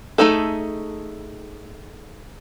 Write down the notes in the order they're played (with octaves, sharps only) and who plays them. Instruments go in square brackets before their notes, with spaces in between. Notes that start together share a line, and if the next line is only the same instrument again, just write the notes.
[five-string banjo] A3 C4 D#4 G#4 A4